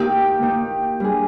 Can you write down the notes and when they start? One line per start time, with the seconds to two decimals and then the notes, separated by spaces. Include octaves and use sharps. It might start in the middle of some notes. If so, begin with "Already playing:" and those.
Already playing: D#3 A#3 D#4 G4 G5
0.42 D#3 A#3 D#4
1.00 G3 D4 G#4